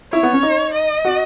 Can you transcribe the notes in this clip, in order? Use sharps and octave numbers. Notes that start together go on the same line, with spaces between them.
E4 C#5
B3
C#4
D#4
D#5
F#4